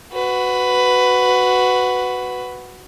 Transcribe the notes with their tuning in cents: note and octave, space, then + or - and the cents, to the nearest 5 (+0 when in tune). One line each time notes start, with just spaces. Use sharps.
F#4 +0 B4 +10